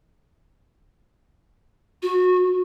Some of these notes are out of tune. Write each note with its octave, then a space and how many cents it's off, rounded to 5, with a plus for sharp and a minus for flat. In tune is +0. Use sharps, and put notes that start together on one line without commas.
F#4 -25